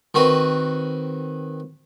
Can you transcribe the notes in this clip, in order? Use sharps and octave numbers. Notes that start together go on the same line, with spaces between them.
D#3 C4 F#4 B4